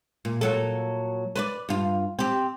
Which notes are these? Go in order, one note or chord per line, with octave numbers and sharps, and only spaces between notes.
A#2
A#2 F#3 A4
B4 C5 D5
G2 F4
C4 G4